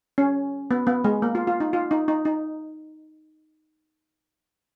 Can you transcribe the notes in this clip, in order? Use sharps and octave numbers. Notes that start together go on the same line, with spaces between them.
C#4
B3
B3
G#3
A#3
F4
F4
D#4
F4
D#4
D#4
D#4